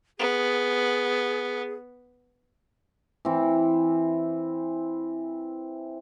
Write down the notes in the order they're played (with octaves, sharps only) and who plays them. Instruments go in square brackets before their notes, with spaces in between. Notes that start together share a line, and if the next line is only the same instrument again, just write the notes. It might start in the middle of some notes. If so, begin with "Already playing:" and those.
[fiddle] B3 [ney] G#4
[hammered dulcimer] E3 C4